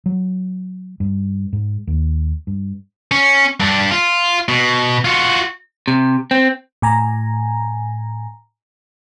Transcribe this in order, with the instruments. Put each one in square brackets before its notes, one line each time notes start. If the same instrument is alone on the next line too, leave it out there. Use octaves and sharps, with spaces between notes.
[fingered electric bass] F#3
G2
G#2
D#2
G2
[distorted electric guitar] C#4
G2 D4
F4
B2
F4 F#4
[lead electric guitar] C3
C4
[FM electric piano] A2 G#5 A#5